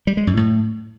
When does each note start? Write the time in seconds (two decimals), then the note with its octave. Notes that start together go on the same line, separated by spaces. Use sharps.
0.07 G3
0.17 G#3
0.27 F#2
0.37 A2